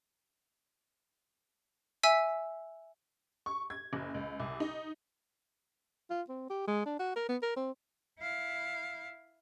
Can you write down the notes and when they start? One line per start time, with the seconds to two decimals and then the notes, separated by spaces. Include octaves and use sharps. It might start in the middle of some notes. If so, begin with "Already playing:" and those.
2.03 E5 G#5 E6 B6
3.46 C#6
3.70 G#6
3.93 F#1
4.14 C#2
4.40 C2
4.60 D#4
6.10 F4
6.29 C4
6.50 G4
6.67 G#3
6.86 D4
6.99 F#4
7.16 A#4
7.29 B3
7.42 A#4
7.56 C4
8.20 E4 F5